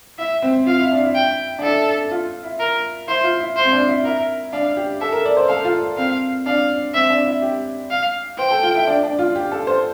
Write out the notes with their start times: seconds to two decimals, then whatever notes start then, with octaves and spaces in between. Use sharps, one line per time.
0.18 E4 E5
0.42 C4
0.66 F4 F5
0.79 E4
0.92 D4
1.05 E4
1.15 G5
1.59 D4
1.63 E4 A4
2.11 F4
2.43 E4
2.60 A#4
3.08 E4 C5
3.24 F4
3.40 E4
3.57 C5
3.64 C4
3.72 D4
3.88 E4
4.04 E4 A#4
4.53 D4 F5
4.77 G4
5.01 A4 E5
5.12 A#4
5.25 D5
5.37 C5
5.48 A4 F5
5.65 F4
5.97 C4 F5
6.46 D4 F5
6.94 C4 E5
7.10 D4
7.26 E4
7.42 G4
7.90 F5
8.38 C5 G5
8.51 A4
8.63 F4
8.75 E4
8.87 D4
9.03 D4
9.19 F4
9.35 G4
9.52 A4
9.67 C5